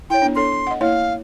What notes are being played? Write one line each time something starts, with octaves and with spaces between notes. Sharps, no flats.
E4 C#5 G5
B3 D4
D4 A4 C#5 C6
D#5 F#5
A#3 E4 C#5 F5